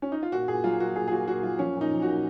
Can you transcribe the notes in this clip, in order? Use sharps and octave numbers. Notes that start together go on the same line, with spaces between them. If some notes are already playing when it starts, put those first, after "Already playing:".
C#4
D#4
F4
A#2 F#4
A#2 G#4
F#3 F4
A#2 F#4
A#2 G#4
G#4
A#2 F#4
A#2 F#4
F#3 F4
F3 C#4
A#2
D#4
F3
A#2 F#4